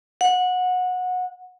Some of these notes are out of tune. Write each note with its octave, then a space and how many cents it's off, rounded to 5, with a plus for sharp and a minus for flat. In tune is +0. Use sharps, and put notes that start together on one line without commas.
F#5 -20